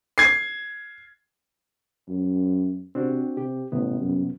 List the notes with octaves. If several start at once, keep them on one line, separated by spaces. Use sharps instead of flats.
G#6 C7
F#2
C3 C4 D4 F#4
C3 G4
A1 G2 C3 B3
F#2